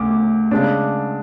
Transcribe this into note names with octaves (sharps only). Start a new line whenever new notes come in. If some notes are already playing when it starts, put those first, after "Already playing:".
Already playing: D2 C#3 D6
C#3 G#3 D4